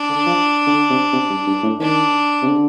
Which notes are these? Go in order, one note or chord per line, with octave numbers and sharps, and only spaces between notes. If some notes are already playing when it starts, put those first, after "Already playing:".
Already playing: D4
D3
F3
D3
C3
C3
G2
G2
A2
D#3 D4
C3
D3